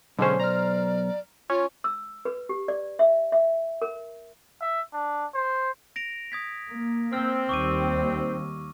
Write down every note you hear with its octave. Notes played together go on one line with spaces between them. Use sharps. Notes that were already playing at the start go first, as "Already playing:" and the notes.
B1 D3 G#3 C#4 C5
D5 A#5 F6
C#4 F4 C#5
E6
B4
G4
D5
E5
E5
A#4
E5
D4
C5
A#6 D7 F7
D#6 G#6 B6
A#3
C4 E6 F6
D#2 G3 C#6 D6 D#7